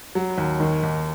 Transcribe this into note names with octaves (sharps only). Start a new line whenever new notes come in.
F#3
D#2
D#3
D#2